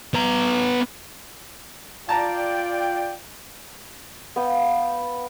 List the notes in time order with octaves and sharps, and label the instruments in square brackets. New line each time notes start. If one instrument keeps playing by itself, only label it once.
[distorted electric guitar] B3 A#5
[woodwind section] F4 D5 G5 [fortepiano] A5 A#5
[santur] B3 F5 G5